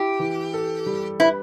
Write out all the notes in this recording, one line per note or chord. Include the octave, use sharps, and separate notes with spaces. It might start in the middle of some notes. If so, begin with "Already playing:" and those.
Already playing: E4 G4
E3
A4
G3
E4 B4